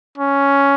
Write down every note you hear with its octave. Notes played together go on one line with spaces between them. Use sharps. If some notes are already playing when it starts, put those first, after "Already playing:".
C#4